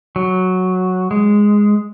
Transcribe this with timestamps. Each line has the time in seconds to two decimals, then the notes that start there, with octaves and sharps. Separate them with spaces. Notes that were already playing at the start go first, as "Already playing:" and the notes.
0.16 F#3
1.11 G#3